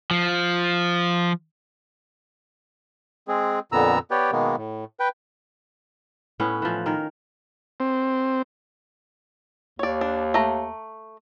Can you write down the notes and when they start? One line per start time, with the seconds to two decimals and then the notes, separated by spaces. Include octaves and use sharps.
0.11 F3
3.28 G#3 C4 G#4
3.72 F2 A#2 D3 B3 A#5 E6
4.11 B3 G4 B4 C#5 D5 G5
4.32 B2 D#3 G#3 A#3 B3
4.56 A2
5.00 B4 G5
6.40 A2 B3 C#4
6.62 E3 F3
6.86 D#3 A#4
7.80 C4
9.79 D#2 C#5 D5
10.01 D4
10.34 A3 A#5